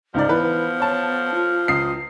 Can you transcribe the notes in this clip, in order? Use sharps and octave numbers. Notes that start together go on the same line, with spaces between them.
C#2 G#2 F3 D5
E3 B3 B4
C#5 A5
F4
C#2 D#6 C7